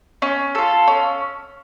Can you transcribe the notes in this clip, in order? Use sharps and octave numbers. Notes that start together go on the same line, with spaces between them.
C#4
F4 A4
C#4